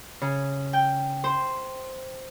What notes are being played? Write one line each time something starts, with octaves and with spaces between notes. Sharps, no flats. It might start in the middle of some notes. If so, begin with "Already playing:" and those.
C#3
G5
C5 C6